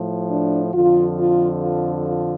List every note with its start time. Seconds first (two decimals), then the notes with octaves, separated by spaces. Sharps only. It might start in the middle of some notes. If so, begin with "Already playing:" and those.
Already playing: A2 F3
0.30 D4
0.73 F2 D3 F3 F4
1.17 F4
1.61 F4
2.05 F4